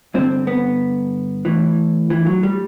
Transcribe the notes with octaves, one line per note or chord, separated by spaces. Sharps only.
G2 D3 C4
B3
A2 E3
E3
F#3
G3